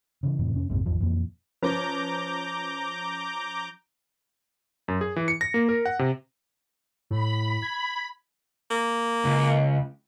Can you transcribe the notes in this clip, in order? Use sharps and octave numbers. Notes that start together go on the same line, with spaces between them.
C#3 E3
F1 A2 C3 E3
F1 C#4
A#1 F2 G#2 C3
G#1 E2 F3
F2 A#2 E3
F3 C#4 B4 A#5 D6 G6
F#2
G#4
E3
C#7
A#6
A#3
A#4
F#5
C3
A2 B5
G#6
A#3
C#2